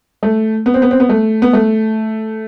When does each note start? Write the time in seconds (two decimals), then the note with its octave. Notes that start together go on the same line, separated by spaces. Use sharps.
0.23 A3
0.66 B3
0.74 C4
0.82 B3
0.91 C4
1.00 B3
1.09 A3
1.42 B3
1.53 A3